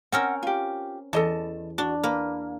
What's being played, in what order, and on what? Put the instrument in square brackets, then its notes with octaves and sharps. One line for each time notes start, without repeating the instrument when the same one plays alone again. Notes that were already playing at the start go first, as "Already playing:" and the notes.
[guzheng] C4 C#4 A#4 [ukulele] F#5
[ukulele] F4 G4
[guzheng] E2 [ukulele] A4 D#5 A5
[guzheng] D4 [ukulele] F#4
[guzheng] A#3 [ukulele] B4